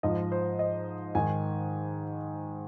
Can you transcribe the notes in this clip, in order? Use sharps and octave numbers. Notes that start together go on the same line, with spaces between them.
G#2 F3 D#5
C5
D#5
G#2 D#3 G#5